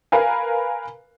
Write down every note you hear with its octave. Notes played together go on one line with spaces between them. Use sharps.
A#4 B4 F5 G#5